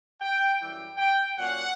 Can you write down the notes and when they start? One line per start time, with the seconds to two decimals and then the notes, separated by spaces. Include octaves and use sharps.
0.22 G5
0.61 F#2 E3 G3 G5
0.98 G5
1.37 A#2 F#3 A#3 C#4 F#5